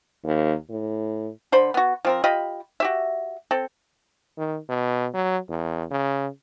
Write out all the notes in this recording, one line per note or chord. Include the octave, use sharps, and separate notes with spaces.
D#2
A2
D3 C5 B5
B3 F#4
F3 C4 A#4
F4 G4 D#5 B5
F#4 G4 E5
C4 A4
D#3
B2
F#3
E2
C#3